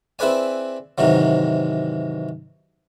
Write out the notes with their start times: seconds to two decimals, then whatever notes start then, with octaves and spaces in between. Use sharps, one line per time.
0.19 C4 E4 G#4 B4 D5 G#5
0.98 G#2 C3 D#3 E3 F#3